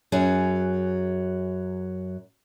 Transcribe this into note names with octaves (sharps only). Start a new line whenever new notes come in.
F#2 F#3 G#4